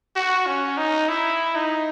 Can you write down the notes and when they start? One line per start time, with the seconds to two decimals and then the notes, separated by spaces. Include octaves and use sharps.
0.16 F#4
0.47 C#4
0.77 D#4
1.09 E4
1.55 D#4